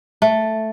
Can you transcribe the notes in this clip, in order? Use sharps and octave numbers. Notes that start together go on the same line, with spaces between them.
A3